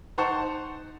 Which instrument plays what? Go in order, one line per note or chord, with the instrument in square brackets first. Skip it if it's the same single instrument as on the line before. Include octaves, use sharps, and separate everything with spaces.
[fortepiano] D#4 C5 F#5 A5 C#6